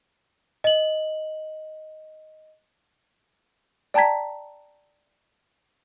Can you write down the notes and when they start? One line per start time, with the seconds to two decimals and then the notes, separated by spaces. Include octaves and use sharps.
0.64 D#5 F#7
3.94 D5 G5 A5 A#5 G#6 B6